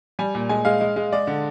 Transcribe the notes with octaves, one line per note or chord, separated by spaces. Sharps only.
G3 G#5
A#2
G#3 G#5
G#3 F5
G#3
G#3
G#3 D5
D3